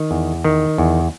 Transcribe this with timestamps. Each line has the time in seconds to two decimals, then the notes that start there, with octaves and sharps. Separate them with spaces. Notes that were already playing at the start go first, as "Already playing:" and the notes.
Already playing: D#3
0.11 E2
0.44 D#3
0.78 E2